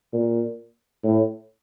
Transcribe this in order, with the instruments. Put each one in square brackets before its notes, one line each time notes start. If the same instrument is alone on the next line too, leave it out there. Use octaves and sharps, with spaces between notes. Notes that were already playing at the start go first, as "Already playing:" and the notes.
[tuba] A#2
A2